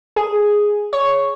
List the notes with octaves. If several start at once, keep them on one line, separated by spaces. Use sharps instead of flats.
G#4
C#5